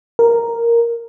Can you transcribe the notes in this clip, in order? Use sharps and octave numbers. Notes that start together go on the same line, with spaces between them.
A#4